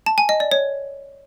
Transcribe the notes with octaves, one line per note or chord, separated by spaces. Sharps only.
A5
G#5
D#5
D5
C#5